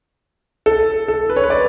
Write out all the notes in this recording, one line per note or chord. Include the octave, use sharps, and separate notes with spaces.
A4
A4
B4
C#5
B4
D5